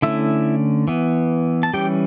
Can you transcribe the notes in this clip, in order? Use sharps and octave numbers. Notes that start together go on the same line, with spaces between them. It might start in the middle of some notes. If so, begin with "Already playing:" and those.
D3 A3 C#4 E4 E5
E3 B3
A5
E3 G3 C#4 G4 G5